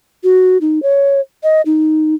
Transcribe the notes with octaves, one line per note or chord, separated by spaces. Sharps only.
F#4
D#4
C#5
D#5
D#4